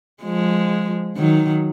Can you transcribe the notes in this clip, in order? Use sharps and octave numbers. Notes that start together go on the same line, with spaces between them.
F3 G#3
D#3 F#3